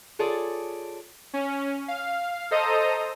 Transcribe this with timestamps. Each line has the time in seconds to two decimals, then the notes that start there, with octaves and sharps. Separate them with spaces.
0.19 F4 G#4 A4 C#5 D5
1.33 C#4
1.88 F5
2.51 A4 C5 D#5 A#5 D#6